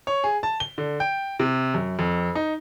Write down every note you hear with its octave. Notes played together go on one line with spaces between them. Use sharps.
C#5
G#4
A5
G7
D3
G5
C3
F#2
F2
D#4